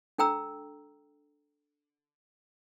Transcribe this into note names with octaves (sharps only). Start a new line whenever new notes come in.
D4 A4 G5 A#5 E6